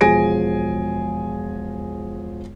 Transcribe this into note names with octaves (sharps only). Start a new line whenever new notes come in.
E1 F3 G#4 G#5 A#6 D7